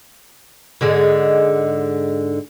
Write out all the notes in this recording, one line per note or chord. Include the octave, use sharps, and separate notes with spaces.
G#2 D3 G#3